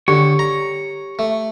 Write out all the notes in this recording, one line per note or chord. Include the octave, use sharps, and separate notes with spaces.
D3 G4 C#5
A#5
A3